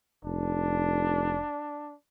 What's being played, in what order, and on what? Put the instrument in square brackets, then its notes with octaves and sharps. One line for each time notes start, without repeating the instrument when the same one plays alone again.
[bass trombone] F1 [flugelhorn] D4